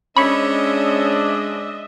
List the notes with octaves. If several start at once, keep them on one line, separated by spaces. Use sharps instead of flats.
G#3 C#4 D4 C5 D#5 E5 B5 C#6